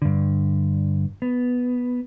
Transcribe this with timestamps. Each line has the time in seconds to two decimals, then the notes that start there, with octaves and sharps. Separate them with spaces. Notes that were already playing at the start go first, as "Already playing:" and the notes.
0.02 G2 D3
1.22 B3